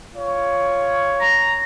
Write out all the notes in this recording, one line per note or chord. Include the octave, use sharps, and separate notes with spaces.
F4 C#5
A#5